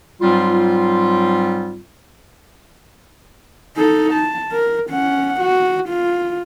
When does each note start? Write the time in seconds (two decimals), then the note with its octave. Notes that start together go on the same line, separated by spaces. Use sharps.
0.22 G#2 F#3 G3 C4 F4
3.77 D#4 A4
4.13 A5
4.52 A#4
4.90 C#4 F#5
5.40 F#4
5.89 F4